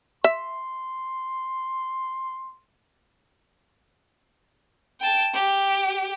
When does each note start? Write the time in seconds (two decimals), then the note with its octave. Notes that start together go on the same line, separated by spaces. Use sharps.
0.24 E5 C6
5.00 G5 A5
5.34 G4